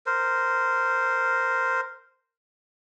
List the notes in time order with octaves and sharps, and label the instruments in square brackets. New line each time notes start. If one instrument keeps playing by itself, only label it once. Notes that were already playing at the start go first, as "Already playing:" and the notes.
[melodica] A#4 C5